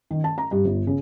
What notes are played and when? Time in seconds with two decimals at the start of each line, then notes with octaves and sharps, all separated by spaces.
0.11 D#3
0.24 A5
0.38 A#5
0.51 G2
0.65 G1
0.87 C#3